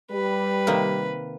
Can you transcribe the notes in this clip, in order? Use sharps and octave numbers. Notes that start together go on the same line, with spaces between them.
G3 B4
C3 D#3 A#3